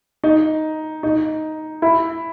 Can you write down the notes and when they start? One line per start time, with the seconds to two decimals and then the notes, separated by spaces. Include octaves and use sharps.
0.24 D#4
1.03 D#4
1.82 E4